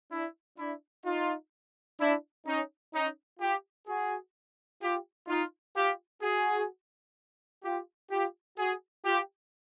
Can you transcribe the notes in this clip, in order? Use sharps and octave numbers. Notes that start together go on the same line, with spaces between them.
D4 E4
D4 E4
D#4 F4
D4 E4
C#4 D#4
C#4 D#4
F4 G4
F#4 G#4
F4 G4
D#4 F4
F4 G4
F#4 G#4
F4 G4
F4 G4
F#4 G#4
F4 G4